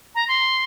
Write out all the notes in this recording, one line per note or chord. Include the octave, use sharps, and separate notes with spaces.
A#5
C6